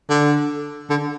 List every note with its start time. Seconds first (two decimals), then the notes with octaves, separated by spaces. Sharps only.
0.10 D3
0.90 D3